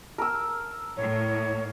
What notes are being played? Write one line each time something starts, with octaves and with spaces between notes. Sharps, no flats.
A#4 E6
A2 C#5